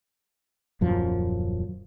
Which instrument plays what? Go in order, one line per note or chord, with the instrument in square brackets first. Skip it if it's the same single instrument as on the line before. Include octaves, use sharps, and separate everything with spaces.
[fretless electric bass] D#1 F#2 F3